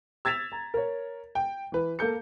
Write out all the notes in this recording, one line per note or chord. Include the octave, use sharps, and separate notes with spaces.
E6 G#6 A6 B6 E7 F7
A#5
A#4 C#5
G5
E3 B4
A#3 A4 G6 C#7